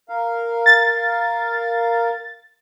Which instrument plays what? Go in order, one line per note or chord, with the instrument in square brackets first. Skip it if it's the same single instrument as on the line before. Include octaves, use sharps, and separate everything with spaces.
[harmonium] A#4 F5
[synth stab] A6